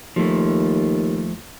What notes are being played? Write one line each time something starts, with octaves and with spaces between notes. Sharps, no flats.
D#2 F3 A3